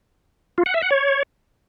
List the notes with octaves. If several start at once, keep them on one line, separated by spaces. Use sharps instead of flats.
F4
F#5
E5
F#5
C#5